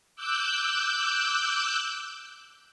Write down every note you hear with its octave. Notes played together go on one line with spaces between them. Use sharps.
D6 E6 F#6 G6